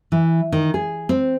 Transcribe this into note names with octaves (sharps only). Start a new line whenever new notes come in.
E3
D#3
G#4
C4